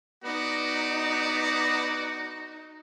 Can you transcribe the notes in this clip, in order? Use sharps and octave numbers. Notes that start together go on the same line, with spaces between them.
B3 D#4 F#4 D5